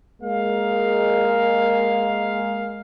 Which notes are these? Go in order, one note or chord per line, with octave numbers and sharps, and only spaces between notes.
G#3 A#3 F5